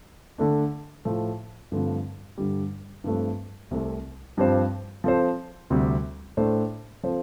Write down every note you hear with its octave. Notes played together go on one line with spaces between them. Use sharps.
D3 A3 D4
A2 F3 A3
G2 D3 F3 A3 C4
G2 D3 G3
G2 F3 A3 C4
C2 C3 A3
G2 F3 C4 G4 C5
F3 C4 A4 C5
D2 C3 G3
A2 A3 D4 A4 C5
F3 C4 A4 C5